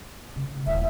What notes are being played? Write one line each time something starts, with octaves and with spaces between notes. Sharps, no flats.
C#3
D#1 E4 E5